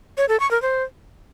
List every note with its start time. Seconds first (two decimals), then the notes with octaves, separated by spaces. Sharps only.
0.17 C#5
0.29 A4
0.40 C#6
0.51 A#4
0.62 C5